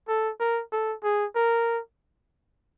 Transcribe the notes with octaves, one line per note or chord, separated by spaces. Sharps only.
A4
A#4
A4
G#4
A#4